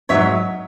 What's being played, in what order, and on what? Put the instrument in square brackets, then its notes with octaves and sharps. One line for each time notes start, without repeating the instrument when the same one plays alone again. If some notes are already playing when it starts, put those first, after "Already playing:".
[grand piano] G#2 F#3 [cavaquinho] C#5 E5